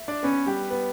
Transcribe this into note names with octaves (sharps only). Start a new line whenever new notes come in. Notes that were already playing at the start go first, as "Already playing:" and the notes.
Already playing: E5
D4 D5
B3 C#4 B4
G3 G4
B3 B4